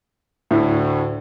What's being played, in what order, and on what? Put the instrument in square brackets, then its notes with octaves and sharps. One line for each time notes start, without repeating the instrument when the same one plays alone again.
[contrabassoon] D2 [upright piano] A2 E4